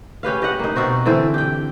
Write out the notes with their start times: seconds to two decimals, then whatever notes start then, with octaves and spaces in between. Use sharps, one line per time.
0.23 C#4 G4 B4 F5
0.42 G4 D#5 F#5
0.59 A#3 D#4
0.76 B2 C4 F#4 C5
1.06 D3 E3 C4 C5
1.34 G4 G5